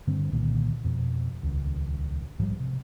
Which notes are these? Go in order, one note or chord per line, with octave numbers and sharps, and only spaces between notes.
G2 D3 G3 C4
C2 A#2 D3 D#3
F2 B2 F3
D#1 C#2
A#1 G#2 F3 G3
C3